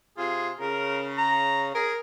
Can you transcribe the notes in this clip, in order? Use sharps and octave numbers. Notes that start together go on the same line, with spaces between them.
C3 F4 G#4
C#3 A#4
A#5
G#4 A#4